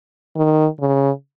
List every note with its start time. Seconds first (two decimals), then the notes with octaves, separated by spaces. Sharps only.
0.36 D#3
0.80 C#3